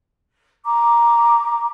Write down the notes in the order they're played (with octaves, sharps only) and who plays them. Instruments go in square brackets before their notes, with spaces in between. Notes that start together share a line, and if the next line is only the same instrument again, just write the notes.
[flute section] A#5 D6